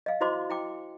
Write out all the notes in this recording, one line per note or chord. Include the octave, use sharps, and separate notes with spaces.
D#5 F5
E4 F#4 C5 D#5 C6 D6
E4 G5 D6